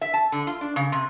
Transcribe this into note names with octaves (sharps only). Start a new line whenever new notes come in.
E5
A5
D3
F4
D4
C#3
C3